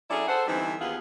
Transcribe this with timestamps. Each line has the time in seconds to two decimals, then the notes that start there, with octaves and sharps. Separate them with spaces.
0.10 F#3 C#4 E4 G#4 A4 D5
0.27 A4 C5 F#5
0.47 D3 E3 G3 B3 C4 D#4
0.80 D#2 B3 F4 G#4